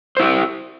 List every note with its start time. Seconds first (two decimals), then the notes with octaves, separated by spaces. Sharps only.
0.17 C5
0.20 E4
0.23 G4